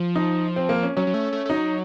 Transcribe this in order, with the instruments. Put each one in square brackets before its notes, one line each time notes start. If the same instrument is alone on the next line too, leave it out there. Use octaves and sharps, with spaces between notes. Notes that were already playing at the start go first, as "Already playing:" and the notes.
Already playing: [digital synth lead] F3
[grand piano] D#4
C4
A#3
C#4
[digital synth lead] F#3 [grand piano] C#4
[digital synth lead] F#3
A3
A3
A3
[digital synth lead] F#3 [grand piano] D#4